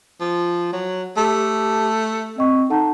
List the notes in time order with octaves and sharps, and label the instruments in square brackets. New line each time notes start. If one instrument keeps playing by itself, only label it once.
[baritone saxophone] F3
F#3
[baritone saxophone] A3 [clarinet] G4 [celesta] A5
[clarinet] C4 [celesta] D#5 C#6
[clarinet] D#4 [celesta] A4 F#5 A5